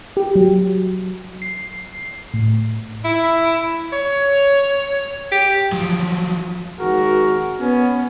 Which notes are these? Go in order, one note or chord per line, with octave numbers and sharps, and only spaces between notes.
G4
F#3
C7
A2
E4
C#5
G4
F3 F#3
G#1 F#4 G#4 A#4
B3 C#4